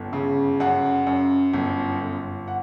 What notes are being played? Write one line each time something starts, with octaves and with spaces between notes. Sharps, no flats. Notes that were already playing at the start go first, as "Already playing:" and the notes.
Already playing: G1 F#2
C#3
F#2 F#5
F#2
G1
G1
F#5